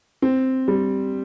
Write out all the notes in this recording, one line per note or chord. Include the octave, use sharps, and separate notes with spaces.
C4
G3